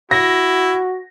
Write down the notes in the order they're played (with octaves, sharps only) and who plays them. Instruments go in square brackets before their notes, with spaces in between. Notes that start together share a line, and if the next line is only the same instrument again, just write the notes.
[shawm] E4 [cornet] F#4 [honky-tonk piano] A#6